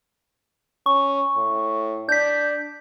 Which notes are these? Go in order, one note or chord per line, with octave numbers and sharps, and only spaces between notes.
C#4 C#6
A2
D4 G6 B6